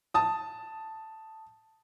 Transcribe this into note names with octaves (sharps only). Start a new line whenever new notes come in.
A5 D#6